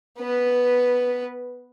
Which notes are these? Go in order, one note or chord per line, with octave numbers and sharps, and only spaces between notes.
B3 B4